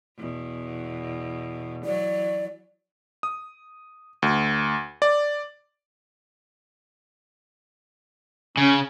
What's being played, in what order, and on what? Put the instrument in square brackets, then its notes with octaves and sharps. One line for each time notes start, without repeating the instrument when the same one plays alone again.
[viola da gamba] E2 B2
[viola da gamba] E3 F#3 [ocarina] D5
[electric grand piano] D#6
D2
D5
[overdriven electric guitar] C#3 [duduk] C#4